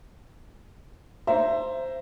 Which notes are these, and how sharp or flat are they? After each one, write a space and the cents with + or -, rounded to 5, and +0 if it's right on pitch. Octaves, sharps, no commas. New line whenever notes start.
C5 +0 E5 +20 A#5 +0